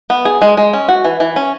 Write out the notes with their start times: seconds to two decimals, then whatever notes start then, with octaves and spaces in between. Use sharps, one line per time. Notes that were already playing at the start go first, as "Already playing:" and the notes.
0.10 B3
0.25 G#4
0.42 G#3
0.57 G#3
0.73 C#4
0.88 F#4
1.04 E3
1.20 E3
1.36 C#4